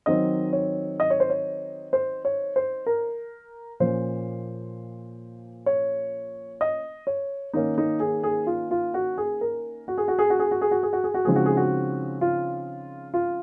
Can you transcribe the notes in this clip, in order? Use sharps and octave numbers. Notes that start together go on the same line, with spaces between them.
D#3 F#3 C4 D#4 D#5
C#5
D#5
C#5
C5
C#5
C5
C#5
C5
A#4
A#2 F3 A#3 C#4 C5
C#5
D#5
C#5
D#3 A#3 C#4 D#4
D#4
G#4
G#4
F4
F4
F#4
G#4
A#4
F#4
G#4
F#4
G#4
F#4
G#4
F#4
G#4
F#4
G#4
F#4
G#4
F#4
C#3 F3 G#3 C4 D#4 G#4
F#4
G#4
F#4
F4
F4